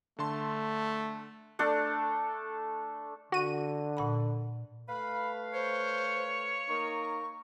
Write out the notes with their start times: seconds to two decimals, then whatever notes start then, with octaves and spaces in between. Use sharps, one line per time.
0.19 D3 A3 A5 C6
1.59 A3 D4 A4
3.32 D3 F#4 D#7
3.97 A#2 F#5 B5
4.88 A3 B4 F5 B5
5.53 C5 C#5
6.68 A#3 D#4 A#4 C#6